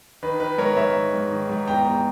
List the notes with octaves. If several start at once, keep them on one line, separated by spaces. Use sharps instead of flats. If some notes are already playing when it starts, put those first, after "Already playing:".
D#3 B4
D#3 B4
G#2 A#4 C#5
G#2 C#5 E5
D#3
G#2
D#3
G#2
E2 G5 A#5
E2